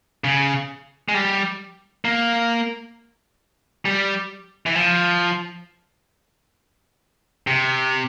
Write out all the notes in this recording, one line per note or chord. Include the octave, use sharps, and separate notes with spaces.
C#3
G#3
G3
A#3
G3
E3
F3
C3